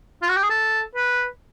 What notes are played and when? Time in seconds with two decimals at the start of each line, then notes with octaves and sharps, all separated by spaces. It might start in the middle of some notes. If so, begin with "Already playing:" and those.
0.22 F4
0.29 F#4
0.36 G4
0.43 G#4
0.50 A4
0.95 B4